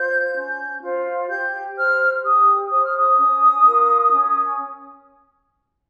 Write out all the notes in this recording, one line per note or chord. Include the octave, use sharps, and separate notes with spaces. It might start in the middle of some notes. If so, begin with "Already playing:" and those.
Already playing: F4 C5 G6
C#4
F4 C5
G4 G6
C5 F6
G4 D#6
C5 D#6
F6
D#6
C#4
F4 A#4
C#4